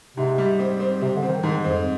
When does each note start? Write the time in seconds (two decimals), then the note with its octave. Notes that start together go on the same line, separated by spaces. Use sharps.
0.17 G#2 C3
0.38 G3
0.59 C4
0.80 C4
1.01 C3 C4
1.16 D3
1.22 C4
1.29 D#3
1.43 G#2 D#3
1.64 F2 C4